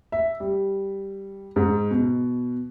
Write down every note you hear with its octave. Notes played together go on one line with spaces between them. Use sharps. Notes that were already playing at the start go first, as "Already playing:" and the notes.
E5
G3
G#2
B2